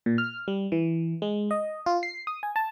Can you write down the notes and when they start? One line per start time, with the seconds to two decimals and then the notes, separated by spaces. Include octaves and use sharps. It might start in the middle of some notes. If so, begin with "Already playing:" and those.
0.06 A#2
0.18 F6
0.48 G3
0.72 E3
1.22 G#3
1.51 D#5
1.86 F4
2.03 C7
2.27 D#6
2.43 G#5
2.56 A5